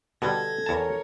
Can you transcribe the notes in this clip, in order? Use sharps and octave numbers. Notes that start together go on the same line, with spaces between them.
B2 D3 G3 A4 G#6 A#6
E2 A#4 C#5 A5